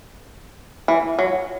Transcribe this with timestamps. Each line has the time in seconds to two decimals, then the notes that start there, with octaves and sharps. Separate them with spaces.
0.88 E3
1.19 F#3